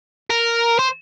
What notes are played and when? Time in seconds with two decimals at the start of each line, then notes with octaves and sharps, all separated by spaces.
0.30 A#4
0.79 C5